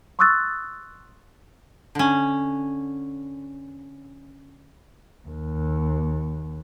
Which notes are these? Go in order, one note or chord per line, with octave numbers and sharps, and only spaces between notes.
C6 C#6 D#6 E6 F#6 A6
D3 C#4
D#2